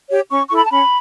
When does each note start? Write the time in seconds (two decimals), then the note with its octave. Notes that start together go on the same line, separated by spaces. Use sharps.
0.10 G4 C#5
0.29 C#4 C#6
0.49 E4 A4 C#6
0.57 B5
0.65 A5
0.69 C#4 B5